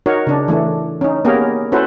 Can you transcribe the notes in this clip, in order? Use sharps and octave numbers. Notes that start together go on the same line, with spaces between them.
D#4 F#4 A#4 C#5
C#3 D4
E3 A3 D4
C#4 D#4
A#3 B3 C#4 G4 G#4 A#4
C#4 E4 F#4 A4 B4 C5